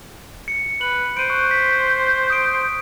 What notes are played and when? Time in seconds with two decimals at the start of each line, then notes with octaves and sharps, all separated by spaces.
0.48 C#7
0.81 B4 F#7
1.17 C5 D7 D#7
1.30 C#6 F#6
1.51 B6
2.30 D#6 D7